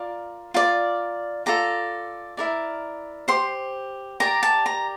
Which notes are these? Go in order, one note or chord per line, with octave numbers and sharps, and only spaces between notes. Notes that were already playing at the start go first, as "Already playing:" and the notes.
Already playing: F4 A#4 D5
F4 A#4 D5
F4 A4 D5 A#5
E4 A#4 D5
G4 C5 C6
G4 A#4 D5 A#5
A5
A#5